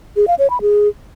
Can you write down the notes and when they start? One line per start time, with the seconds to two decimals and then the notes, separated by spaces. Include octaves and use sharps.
0.16 G#4
0.28 F5
0.39 C#5
0.50 B5
0.61 G#4